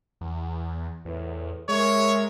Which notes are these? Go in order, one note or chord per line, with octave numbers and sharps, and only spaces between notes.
E2
E2 A2 E3
G#3 A#4 C#5 E5